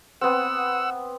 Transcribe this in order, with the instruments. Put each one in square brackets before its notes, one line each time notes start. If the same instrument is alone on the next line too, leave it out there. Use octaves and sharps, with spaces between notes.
[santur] B3 C4 [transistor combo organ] F#5 E6